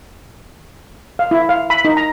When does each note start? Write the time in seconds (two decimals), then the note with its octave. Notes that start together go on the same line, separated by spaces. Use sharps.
1.19 F5
1.31 E4
1.49 F5
1.70 B5
1.85 D#4
1.97 A#5